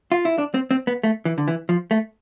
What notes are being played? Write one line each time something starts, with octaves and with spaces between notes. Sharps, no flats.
F4
E4
D4
C4
C4
B3
A3
E3
D3
E3
F3
A3